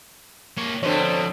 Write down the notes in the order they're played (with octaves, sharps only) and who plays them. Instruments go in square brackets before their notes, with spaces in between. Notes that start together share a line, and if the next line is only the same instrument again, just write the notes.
[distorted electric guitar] A#3 C#5
[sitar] B2 D3 C4 [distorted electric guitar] F3 C#4 [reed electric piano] C5 C#5